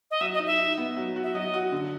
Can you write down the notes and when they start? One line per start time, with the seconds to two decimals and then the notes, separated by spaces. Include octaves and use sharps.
0.11 D#5
0.21 F#3 E5
0.34 D#5
0.39 D#4
0.46 E5
0.59 D#4
0.78 B3
0.97 F#3
1.16 F#4
1.23 E5
1.35 F#3 D#5
1.54 F#4
1.72 D3